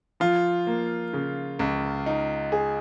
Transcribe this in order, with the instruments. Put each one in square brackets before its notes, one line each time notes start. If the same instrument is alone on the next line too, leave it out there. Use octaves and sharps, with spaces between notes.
[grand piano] F3 [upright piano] F4
[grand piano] A#3
C#3
C#2
D#4
G#4